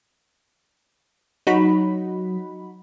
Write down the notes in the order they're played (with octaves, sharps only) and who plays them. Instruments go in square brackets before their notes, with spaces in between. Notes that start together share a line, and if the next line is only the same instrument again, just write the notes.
[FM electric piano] F#3 [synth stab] D#4 F#4 B5